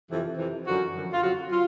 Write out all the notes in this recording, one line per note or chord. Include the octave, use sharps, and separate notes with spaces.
F2 C3 E3
F2 C3 E3
F#2 D3 F3 F#4
F#2 D3 F3
F4
F2 C#3 F#3 F#4
F#3 F4